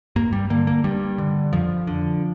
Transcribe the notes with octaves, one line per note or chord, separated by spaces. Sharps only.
G2 A#3
G3
D3 A#3
A#3
G2 G3
D3
F2 F3
D3